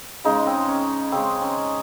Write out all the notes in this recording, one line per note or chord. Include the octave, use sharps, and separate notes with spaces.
C#3 G#3 D#4
C4
C#4
C#3 G#3 C4
C#4